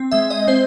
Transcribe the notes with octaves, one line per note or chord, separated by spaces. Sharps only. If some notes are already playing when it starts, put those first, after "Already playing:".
Already playing: C4
G#3 E5
D#5
C4 C5